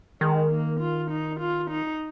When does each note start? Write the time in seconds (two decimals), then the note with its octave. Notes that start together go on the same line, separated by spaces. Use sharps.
0.21 D#3 G#3
0.51 A#3
0.80 F4
1.11 D#4
1.40 F4
1.70 D#4